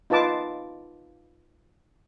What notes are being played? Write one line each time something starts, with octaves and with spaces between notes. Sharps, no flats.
D#4 F4 B4 A5 D6